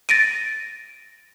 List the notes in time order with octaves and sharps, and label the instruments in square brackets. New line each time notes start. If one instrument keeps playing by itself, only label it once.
[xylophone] A6 A#6 D7 D#7